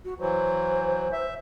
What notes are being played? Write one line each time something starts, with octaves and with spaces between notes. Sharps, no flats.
F#4
E3 F#3 C5
E5